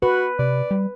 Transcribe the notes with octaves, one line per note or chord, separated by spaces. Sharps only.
F#4 B4
C3 D5
G3